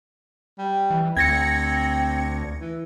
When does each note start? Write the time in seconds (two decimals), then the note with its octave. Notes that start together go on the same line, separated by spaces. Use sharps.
0.59 G3
0.90 E3
1.17 D2 C4 G#6 A#6 C#7
2.61 E3